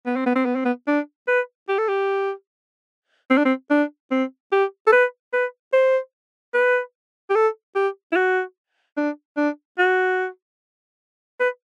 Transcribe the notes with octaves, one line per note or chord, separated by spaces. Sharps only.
B3
C4
B3
C4
B3
C4
B3
D4
B4
G4
A4
G4
C4
D4
C4
D4
C4
G4
A4
B4
B4
C5
B4
G4
A4
G4
E4
F#4
D4
D4
F#4
B4